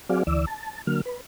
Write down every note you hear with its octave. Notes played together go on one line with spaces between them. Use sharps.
F#3 C4 F#4 G#4 D5 F5
D2 E3 D5 E6
A5
D3 F#3 A#3 F6
B4